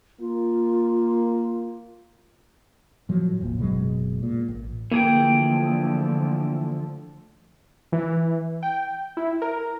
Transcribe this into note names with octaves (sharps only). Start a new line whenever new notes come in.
A#3 F4
A2 F3 F#3
D#1 G#1 A#2
F#1 B2 F#3 G#3
A#2
A1
D3 E3 F3 A3 A#3 G#4 G5
E3
G5
E4
A#4